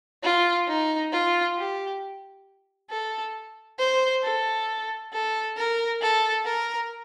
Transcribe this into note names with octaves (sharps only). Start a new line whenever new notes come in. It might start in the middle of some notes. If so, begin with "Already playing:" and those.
F4
D#4
F4
G4
A4
C5
A4
A4
A#4
A4
A#4